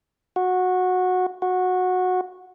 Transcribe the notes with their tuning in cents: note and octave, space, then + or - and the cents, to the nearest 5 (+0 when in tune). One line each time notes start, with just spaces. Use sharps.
F#4 -15
F#4 -15